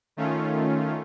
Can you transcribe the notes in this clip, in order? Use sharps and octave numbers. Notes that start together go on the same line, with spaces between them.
D#3 A3 C#4 F4